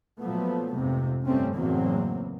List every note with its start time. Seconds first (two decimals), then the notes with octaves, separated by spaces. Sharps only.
0.19 A#2 F3 F#3 A3 B3
0.74 F2 G#2 C3
1.25 G1 G3 A3 C4 C#4
1.55 F#1 E2 A2 F#3 A#3 C4